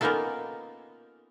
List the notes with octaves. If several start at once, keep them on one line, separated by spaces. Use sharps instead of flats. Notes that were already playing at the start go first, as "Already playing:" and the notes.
A#3 B3 C#4 D#4 F4 A4